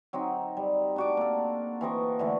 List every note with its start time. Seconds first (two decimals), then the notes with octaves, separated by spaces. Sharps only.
0.13 F#3 C4 D#4
0.57 G3
0.96 D4 F#4 D6
1.17 A#3 A4
1.81 E3 C4 D#5 C#6
2.19 D3 E3 A3